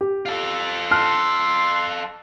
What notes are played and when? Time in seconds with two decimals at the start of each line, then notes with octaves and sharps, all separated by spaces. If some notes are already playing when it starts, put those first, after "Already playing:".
0.01 G4
0.26 F4 A4
0.91 A5 C6 F6 F#6